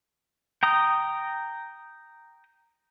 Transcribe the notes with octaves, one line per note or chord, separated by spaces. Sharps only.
G5 A#5 D#6